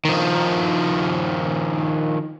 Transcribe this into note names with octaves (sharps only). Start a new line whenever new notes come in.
D#3 F3